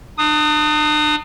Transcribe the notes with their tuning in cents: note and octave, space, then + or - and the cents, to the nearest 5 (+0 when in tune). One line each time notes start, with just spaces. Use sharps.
D4 +40 D#6 +0